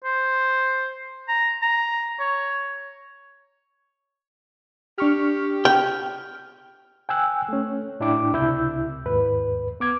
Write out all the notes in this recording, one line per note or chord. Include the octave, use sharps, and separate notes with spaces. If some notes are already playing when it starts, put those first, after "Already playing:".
C5
A#5
A#5
C#5
D4 G4 C#6 F6
G5 F6
G5 G#5 E6 F#6
A3 C#4
A2 D4 E4 G5 D6
C#2 C3 E4 E6 G6
D#2 G#2 B4
B3 D6 G#6